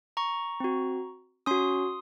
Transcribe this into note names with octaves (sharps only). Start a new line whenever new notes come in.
A#5 C#6
C4 F#4
C#4 F#4 C6 D#6